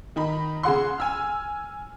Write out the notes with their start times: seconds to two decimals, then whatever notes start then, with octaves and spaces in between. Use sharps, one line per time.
0.16 D#3 D#4 B5
0.63 C#3 G#4 F#5 C6
0.98 G#5 E6 F6